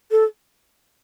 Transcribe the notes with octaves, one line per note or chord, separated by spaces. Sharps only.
A4